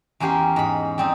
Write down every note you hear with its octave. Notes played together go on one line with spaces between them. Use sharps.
E2 A#3 C#4 G4 C6
G#2 B5
G3 C4 D#4